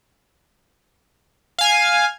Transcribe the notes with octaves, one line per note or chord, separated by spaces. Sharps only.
F5 G#5